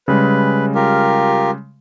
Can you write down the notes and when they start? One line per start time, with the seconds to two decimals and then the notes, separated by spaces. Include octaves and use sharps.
0.08 C#3 G3 G#3 B4
0.75 F4 G4 A#4